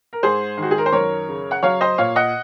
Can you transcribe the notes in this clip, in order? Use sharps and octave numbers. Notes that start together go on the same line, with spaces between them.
A#4
G#2 G#4 C5
D#3
F#4
G#4
A#4
C5
F#2 A#4 C#5
C#3
F#5
F#3 C#5 F5
C5 D#5
A#2 C#5 F5
D#5 F#5